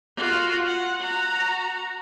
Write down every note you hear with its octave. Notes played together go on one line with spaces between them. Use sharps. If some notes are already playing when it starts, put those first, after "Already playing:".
F4 F#4
F#5
F#4 A#5